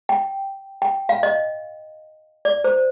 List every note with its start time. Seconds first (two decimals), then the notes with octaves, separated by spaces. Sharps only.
0.09 G5
0.82 G5
1.09 F5
1.23 D#5
2.45 D5
2.64 C5